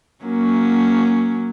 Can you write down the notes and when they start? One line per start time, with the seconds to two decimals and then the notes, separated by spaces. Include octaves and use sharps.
0.24 F#3 A#3 C#4